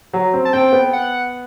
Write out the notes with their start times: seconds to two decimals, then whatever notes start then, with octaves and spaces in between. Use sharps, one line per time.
0.13 F#3
0.33 C4
0.45 A5
0.53 C4 G5
0.73 B3
0.93 F#5